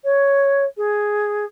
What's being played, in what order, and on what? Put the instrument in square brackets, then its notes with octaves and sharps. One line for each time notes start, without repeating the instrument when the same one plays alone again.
[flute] C#5
G#4